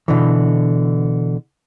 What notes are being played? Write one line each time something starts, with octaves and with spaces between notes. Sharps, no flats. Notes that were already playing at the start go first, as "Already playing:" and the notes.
B2 D3 E3